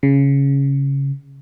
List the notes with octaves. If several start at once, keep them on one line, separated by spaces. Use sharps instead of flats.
C#3